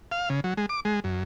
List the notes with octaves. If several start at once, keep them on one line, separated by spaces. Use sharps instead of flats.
F5
C#3
F#3
G#3
D6
G#3
F#2